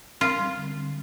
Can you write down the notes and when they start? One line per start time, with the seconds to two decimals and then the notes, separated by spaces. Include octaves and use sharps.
0.21 C4 F4
0.39 G3
0.57 D3
0.75 D3